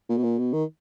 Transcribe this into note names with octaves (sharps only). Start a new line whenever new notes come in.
A#2
B2
A#2
B2
D#3